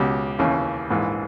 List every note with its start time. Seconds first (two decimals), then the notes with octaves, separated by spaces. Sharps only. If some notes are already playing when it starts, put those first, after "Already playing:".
Already playing: C#2 B2 G4
0.39 D#2 C#3 E3
0.90 A#1 G#2 E3